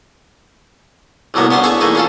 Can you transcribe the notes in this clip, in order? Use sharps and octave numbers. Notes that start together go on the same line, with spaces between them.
C2 A2 F#3 A#3 B3
B3 C#4 D4 C5
E4 G#4 B4 C#6 D#6
E3 A3 A#3 D#4 G#4
C#4 F4 A4